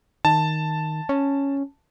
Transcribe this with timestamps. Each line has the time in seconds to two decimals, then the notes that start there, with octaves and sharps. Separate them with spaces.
0.25 D#3 A5
1.09 C#4